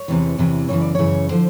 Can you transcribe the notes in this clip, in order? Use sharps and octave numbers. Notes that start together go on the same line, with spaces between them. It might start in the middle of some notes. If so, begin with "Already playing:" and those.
Already playing: C#5
E2 C3 E3
E2 C3 E3
F#2 C#3 E3 C#5
D5
F#2 C#3 E3 C#5
D3 F3 C5